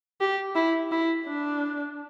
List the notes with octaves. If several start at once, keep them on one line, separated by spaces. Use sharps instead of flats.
G4
E4
E4
D4